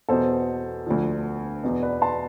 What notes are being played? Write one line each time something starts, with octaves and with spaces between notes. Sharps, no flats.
E2 B2 A4 C5
D2 D3 F3
E2 B2
B4 D5
A5 C6